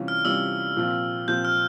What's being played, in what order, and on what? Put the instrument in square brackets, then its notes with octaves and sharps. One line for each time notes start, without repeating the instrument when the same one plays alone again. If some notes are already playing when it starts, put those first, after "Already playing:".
Already playing: [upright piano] C3 E3 G3 C#4 F4
[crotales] F6
[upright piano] C3 E3 G3 C#4 F4 [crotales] E6
[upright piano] A#2 F3 C4 F4
[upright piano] A#2 F3 C4 F4 [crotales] G6
[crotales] F6